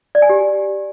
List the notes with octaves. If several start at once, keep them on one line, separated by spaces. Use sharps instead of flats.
D5
G#5
G4